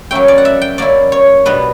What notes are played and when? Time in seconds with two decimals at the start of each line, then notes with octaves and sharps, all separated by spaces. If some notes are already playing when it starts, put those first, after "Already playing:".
0.11 F#3 A#3 C#4 E4 G5
0.28 D5
0.38 F#5
0.45 E5
0.62 G5
0.78 F#3 A#3 C#4 E4 D5
1.12 C#5
1.45 B2 G3 B3 D4 B4